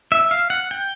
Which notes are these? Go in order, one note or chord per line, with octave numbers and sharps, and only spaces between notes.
E5
F5
F#5
G5